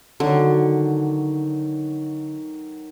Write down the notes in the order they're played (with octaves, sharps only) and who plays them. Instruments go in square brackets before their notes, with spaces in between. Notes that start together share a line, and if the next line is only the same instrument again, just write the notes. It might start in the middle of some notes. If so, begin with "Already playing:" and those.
[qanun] D3 [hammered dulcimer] D#3 F#3